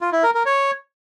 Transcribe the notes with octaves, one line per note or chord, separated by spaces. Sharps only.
F4
E4
A#4
A#4
C#5